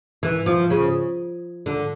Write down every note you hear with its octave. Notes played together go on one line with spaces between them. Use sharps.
E3
F3
C#3
D3